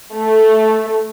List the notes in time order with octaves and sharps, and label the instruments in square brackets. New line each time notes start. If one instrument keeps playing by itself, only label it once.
[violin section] A3